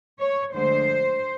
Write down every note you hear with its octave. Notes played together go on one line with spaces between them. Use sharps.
C#5
D2 D3 F3 G#3 C5